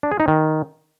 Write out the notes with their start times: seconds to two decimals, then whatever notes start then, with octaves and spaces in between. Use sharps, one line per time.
0.03 D4
0.11 G#4
0.20 D#4
0.28 D#3